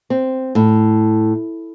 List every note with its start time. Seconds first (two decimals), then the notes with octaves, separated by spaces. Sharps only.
0.10 C4
0.55 A2